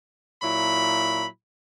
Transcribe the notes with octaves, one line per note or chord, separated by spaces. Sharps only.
A#2 F#3 E4 B5